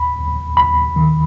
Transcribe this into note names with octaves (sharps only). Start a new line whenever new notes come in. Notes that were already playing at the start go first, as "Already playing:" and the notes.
Already playing: D#2 B5
D#2
D#2 B5
D#3